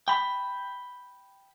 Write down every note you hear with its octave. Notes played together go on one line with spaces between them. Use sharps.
G5 B5